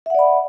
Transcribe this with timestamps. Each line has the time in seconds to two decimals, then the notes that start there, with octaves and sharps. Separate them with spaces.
0.06 E5
0.10 F#5
0.15 D5
0.19 B5